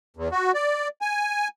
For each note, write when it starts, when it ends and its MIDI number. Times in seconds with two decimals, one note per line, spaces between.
0.17 0.28 40
0.32 0.52 66
0.54 0.88 74
1.01 1.48 80